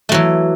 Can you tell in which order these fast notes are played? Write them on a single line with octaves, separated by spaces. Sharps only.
A3 F#3 E3